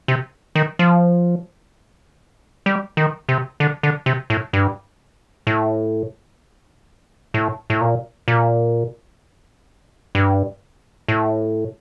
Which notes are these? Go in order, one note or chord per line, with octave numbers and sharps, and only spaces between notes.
C3
D#3
F3
G3
D#3
C3
D3
D3
C3
A2
G2
A2
A2
A2
A#2
A#2
G2
A2